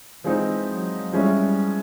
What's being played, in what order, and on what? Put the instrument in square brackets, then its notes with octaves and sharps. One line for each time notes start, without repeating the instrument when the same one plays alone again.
[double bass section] E3 [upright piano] F3 G#3 C4 D#4
[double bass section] F#3
[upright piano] F3 G#3 C#4 E4 [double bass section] G3